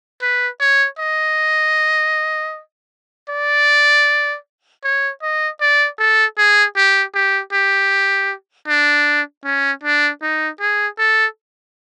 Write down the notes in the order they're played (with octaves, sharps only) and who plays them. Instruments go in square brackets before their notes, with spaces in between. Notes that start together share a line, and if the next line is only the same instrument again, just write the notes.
[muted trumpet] B4
C#5
D#5
D5
C#5
D#5
D5
A4
G#4
G4
G4
G4
D4
C#4
D4
D#4
G#4
A4